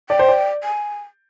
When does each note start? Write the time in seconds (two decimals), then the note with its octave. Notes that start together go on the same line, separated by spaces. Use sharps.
0.10 D5 G5
0.19 C5
0.29 D5
0.64 G#5